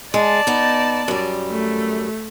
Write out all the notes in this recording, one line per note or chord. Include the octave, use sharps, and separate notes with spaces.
G#3 D5 A5
B3 D#4
F#2 G3
A3